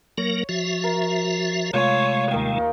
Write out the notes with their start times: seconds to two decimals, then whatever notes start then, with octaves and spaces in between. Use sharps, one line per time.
0.18 F#3 A#3 A#4 C#5
0.49 F3 F#4 E5
0.84 A#4
1.74 C3 G#3 A3 F4 C#5 G#5
2.31 D#2 D#3 A#4 F5 G5